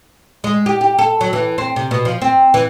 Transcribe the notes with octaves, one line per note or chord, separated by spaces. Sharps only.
G#3
G4
G4
A4
F#3
E3
C4
C3
B2
F3
C4
E3